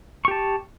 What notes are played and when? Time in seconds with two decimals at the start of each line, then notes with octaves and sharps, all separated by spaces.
0.25 C#6
0.28 G4
0.31 A5